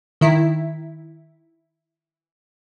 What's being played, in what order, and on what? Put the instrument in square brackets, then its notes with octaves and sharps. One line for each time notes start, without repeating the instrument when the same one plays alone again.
[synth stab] D#3 E4